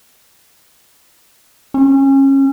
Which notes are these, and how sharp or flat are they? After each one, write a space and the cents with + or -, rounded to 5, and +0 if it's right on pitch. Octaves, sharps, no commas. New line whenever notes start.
C#4 -25